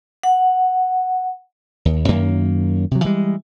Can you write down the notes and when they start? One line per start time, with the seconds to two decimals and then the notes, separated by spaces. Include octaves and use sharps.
0.23 F#5
1.85 D#2
2.08 F#2 D#3 A#3
2.91 C3 F#3
3.04 E3 G3 G#3